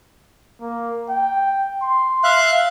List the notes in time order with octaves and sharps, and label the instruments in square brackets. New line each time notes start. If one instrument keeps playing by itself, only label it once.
[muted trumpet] A#3
G5
C6
[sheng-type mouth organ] E5 F5 F#6